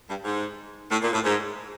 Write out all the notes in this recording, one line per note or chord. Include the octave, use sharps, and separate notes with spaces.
G2
G#2
A2
A#2
A2
G#2